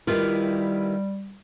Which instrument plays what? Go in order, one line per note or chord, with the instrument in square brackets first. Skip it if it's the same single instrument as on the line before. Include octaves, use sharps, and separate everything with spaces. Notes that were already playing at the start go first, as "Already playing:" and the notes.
[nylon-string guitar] D#3 F4 [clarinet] G3 [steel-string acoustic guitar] E4 G4 B4